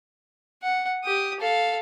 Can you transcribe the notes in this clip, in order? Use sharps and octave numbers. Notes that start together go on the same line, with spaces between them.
F#5
G4 D#6
A4 F5